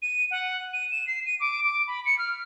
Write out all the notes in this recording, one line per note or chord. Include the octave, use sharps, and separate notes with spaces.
D#7
F#5
D#7
E7
C7
D#7
D6
D6
B5
C#7
F6